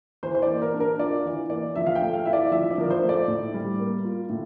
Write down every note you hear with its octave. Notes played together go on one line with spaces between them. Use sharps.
E3 C5
C5
D5
A#3
A#4
D4
A#4
F4 D5
E3
A#3 D5
F3 E5
F5
G5
A3
F5
E4 E5
D5
F3 E5
D5
F3 A#4
C5
A3
D5
A2
G3
A#3
F4
A2